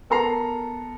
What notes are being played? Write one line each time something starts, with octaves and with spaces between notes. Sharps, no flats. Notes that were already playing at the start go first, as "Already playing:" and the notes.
B3 A4 A#4 A#5 C7 F7